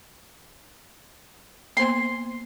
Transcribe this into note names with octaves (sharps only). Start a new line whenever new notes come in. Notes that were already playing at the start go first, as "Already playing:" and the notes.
A#3 B3 C5 C6